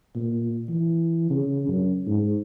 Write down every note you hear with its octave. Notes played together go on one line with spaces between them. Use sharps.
A#2
E3
C#3
F#2
G#2